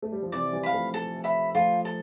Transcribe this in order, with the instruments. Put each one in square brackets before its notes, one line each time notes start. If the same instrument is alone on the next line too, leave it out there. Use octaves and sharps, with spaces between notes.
[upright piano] A3
G3
F3
[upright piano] C3 E3 [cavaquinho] D5
[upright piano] E3 G3
[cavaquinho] F5 B5
[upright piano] F3 A3
[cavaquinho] A4
E5 B5
[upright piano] F3 A3 [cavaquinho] F4
[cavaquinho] A4